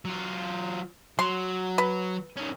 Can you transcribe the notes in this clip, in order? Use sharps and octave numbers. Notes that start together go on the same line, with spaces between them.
F#3 F4
F#3 C6
B4
D#3 C#4